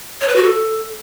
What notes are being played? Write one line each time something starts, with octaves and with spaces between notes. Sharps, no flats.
C#5
B4
F#4
A4